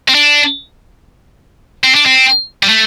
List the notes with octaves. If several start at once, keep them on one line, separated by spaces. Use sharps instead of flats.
C4
D4
C4
D4
C4
G3
A3